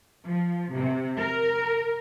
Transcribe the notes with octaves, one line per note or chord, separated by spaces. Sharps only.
F3
C3
A#4